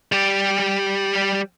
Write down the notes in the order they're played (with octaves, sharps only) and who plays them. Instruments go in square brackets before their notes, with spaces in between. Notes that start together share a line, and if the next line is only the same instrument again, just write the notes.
[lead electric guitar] G3 G4